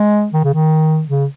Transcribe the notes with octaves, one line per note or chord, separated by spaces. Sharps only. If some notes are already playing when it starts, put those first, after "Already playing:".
Already playing: G#3
D#3
C#3
D#3
C#3